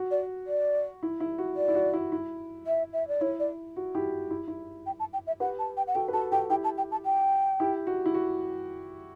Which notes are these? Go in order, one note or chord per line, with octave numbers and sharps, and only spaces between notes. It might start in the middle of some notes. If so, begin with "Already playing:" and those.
Already playing: F#4
D5
D5
E4
E4
F#4
D5
E4
F#4
E4
E4
E5
E5
D5
E4 C#5
D5
F#4
E4 G4
E4
E4
G5
A5
G5
E5
G4 B4 F#5
A5
G5
F#5
F#4 A4 G5
B4
F#4 A4 A5
F#4 A4 G5
E4 G4 G5
A5
G5
A5
G5
E4 G4
F#4
E4
F#4